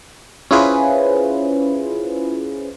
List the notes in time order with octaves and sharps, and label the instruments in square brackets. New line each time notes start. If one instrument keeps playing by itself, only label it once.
[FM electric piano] C#4 E4 F4 G#4 B4 C5